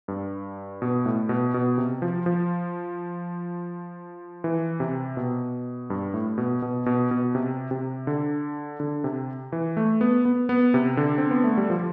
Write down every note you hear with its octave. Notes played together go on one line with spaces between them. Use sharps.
G2
B2
A2
B2
B2
C3
F3
F3
E3
C3
B2
G2
A2
B2
B2
B2
B2
C3
C3
D3
D3
C3
E3
A3
B3
B3
B3
C3
D3
C4
B3
A3
G3
F3